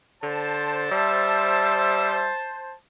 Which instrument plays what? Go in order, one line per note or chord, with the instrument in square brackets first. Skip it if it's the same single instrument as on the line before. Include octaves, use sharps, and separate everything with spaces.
[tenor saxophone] D3 [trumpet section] C5 A5
[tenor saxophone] G3 [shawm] E5